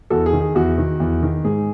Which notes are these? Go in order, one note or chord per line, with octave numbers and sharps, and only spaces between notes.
E2 F#4 A4
G#4
D#3
G#4
E2 F#4
D#3
E2
D#3
G#2 G#4